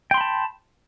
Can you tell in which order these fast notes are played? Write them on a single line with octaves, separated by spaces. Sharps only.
G5 C6 B5 A5